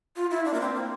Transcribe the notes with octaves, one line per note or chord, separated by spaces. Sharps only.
F4
E4
D4
A#3
C4
A#3